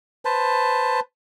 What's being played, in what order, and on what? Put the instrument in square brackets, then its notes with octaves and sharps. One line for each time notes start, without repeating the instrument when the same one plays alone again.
[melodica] B4 C5 A5